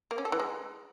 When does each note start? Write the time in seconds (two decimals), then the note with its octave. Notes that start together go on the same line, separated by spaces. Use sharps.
0.11 A#3
0.18 C#4
0.25 A4
0.32 E3
0.40 G#3